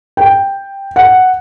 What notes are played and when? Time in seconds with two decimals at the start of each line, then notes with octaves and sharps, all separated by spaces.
0.17 G5
0.96 F#5